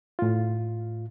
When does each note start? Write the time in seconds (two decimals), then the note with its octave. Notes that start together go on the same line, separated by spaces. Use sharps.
0.19 A2 F4